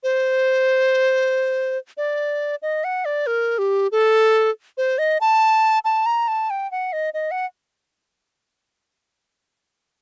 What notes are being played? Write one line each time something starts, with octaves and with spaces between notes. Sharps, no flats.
C5
D5
D#5
F#5
D5
A#4
G4
A4
C5
D#5
A5
A5
A#5
A5
G5
F#5
D#5
D#5
F#5